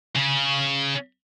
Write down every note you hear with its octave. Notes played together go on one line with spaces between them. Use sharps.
C#3 C#4